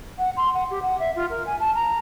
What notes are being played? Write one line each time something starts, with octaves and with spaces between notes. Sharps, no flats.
F#5
C6
F#5
G4
F#5
E5
F4
A#4
G#5
A5
A#5